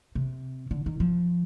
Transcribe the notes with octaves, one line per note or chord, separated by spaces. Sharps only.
C3
D3
D#3
F3